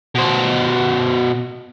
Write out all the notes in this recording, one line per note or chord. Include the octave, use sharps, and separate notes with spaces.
B2 C5